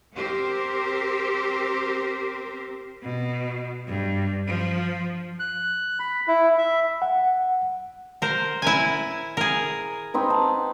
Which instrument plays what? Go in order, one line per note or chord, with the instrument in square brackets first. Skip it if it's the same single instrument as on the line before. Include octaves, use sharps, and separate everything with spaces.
[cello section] C4 G4 A#4 C5
[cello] B2
G2
F3
[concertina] F#6
B5
E4
E5
[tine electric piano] F#5
[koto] A#4 C5
E4 A#4 G#5
G#4 A#4
[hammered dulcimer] C4 D#4 B4
A5